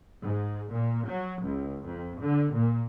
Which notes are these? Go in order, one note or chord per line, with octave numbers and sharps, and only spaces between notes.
G#2
A#2
F#3
C#2
F2
D3
A#2